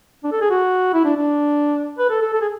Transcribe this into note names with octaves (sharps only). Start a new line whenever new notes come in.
D4
A4
G#4
F#4
E4
D4
D4
B4
A4
A4
A4
G#4